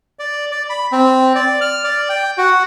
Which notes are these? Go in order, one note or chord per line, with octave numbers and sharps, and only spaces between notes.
D5
D5
B5
C4
D5
F6
D5
G5
F#4